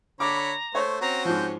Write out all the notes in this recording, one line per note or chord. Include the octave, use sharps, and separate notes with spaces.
D3 C#5 A#5 B5 D6
A3 C5 C#5
C4 C#4 F#4 A#5
G#2 F3 G6